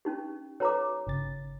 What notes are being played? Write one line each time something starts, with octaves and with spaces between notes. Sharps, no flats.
C#4 D#4 G4
F#4 A4 B4 C#5 A#5 D6
G1 C#3 A6